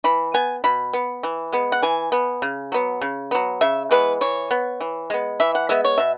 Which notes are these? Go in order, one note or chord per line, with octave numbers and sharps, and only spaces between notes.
E3 B5
B3 G#5
B2 B5
B3
E3
G#3 B3
F#5
E3 G#5
B3
C#3
F#3 B3
C#3
F#3 B3
C#3 E5
E3 G#3 B3 B4
E3 C#5
B3
E3
G#3 B3
E3 E5
F#5
G#3 B3 E5
C#5
B2 E5